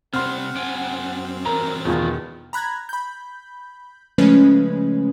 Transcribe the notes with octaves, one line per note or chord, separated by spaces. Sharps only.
C3 G3 C4 F#5 C6 F6
F#2 G5 G#5
G2 E3 F#3 A#4 A#5
E2 B2 D#3 F4
A#5 B5 F#6 G#6 A#6
B5 G6
C#3 F3 G#3 A3 C#4 B4